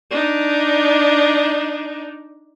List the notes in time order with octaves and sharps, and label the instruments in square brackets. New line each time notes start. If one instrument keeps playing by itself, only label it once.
[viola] D4 D#4